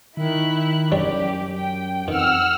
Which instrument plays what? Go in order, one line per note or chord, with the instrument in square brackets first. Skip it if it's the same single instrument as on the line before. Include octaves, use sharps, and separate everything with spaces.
[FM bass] D#3 [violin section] E4 F#6
[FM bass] F#2 [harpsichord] G3 D4 C#5 [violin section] G4
[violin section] G5
[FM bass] F2 [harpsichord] D#3 [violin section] F#5 [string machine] E6 F6